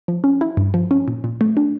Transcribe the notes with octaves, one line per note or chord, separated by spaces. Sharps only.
F3
C#4
E4
G2
F3
C#4
A#2
A#2
A3
D4